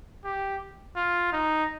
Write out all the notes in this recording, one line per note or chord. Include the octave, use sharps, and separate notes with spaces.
G4
F4
D#4